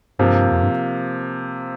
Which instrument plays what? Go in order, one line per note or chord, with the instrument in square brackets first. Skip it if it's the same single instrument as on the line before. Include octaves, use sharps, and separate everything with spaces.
[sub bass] G2 [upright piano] C3 F3 A#3
[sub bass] F2
G2